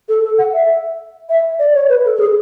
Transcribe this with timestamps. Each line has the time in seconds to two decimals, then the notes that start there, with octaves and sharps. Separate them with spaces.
0.09 A4
0.24 A4
0.38 F#5
0.53 E5
1.29 E5
1.59 D5
1.74 C#5
1.89 B4
2.05 A4
2.16 A4
2.19 G#4